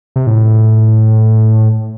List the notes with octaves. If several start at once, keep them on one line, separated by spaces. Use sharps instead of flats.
C3
A2